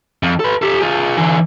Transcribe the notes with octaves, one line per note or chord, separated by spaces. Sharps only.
F2
A4 B4
G4 A4
F4 G#4
D3 E3